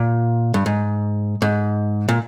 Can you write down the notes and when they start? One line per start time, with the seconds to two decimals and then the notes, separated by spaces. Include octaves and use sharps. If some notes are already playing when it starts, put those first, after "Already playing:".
Already playing: A#2
0.54 G2
0.66 G#2
1.42 G#2
2.09 A#2